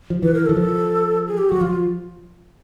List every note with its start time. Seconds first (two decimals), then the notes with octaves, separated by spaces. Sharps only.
0.10 F3
0.22 E3 B4
0.34 A#4
0.46 E3 A4
0.57 F3
1.27 G#4
1.38 G4
1.49 F#3 F#4
1.61 F3 F4